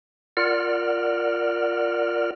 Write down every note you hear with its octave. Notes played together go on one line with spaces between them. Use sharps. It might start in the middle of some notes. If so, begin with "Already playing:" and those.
F4 A#4 D5 F#5 F6